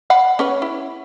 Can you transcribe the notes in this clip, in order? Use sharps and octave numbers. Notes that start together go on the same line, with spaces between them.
F5 F#5 B5
C#4 B4 C#5
E4